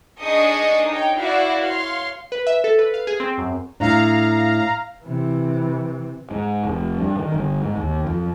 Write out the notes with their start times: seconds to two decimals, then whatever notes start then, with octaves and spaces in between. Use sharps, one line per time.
0.21 D4 D#4 G#4 D#5 C#6 D#6
0.88 D#4 C#5 G5
1.18 E4 F#4 D5 F5
1.63 C#5 F5 C6
2.32 B4
2.47 E5
2.64 A4
2.79 B4
2.94 F5
3.07 G#4
3.20 C4
3.38 F#2
3.80 A2 D4 F5 A#5
5.03 C3 E3
6.31 G#2
6.65 F1
6.98 G2
7.19 D#3
7.34 G1
7.62 G#2
7.77 D#2
8.07 F2